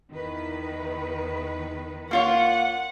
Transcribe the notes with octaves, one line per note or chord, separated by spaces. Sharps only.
E2 D#3 B4
A#3 F4 C#5 F#5